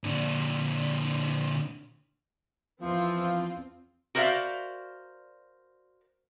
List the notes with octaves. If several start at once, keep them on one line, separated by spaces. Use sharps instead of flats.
A#2 D3
E2 E3 F3 C4 F4
F#4 A#4 C5 D5 E5 F5